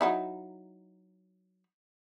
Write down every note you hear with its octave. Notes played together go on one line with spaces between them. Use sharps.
F#3 D#4 E4